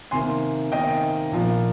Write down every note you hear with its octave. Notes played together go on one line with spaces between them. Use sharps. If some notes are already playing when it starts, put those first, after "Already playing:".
C3 D#3 A#3 G#5 C6
C3 D#3 A#3 D#5 G5
A#2 F3 A#3